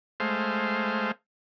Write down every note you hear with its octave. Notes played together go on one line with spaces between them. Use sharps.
G#3 A3 C5 F5